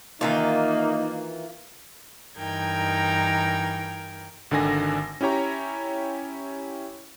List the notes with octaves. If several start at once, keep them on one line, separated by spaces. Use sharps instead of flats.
D#3 E3 A#3 D#4 F4
G2 E3 D#4 A#4 G5 G#6
G#1 D3 D#3 D4 G#5 A#6
C#4 E4 G4 C#5 A#5